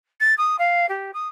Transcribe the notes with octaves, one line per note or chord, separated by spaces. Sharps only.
A6
D#6
F5
G4
D#6